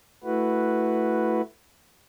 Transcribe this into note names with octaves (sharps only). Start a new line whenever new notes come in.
A3 E4 F#4 B4